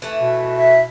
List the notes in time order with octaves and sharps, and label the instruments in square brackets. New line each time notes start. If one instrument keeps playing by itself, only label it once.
[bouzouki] E3 A3
[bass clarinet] B2
[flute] E5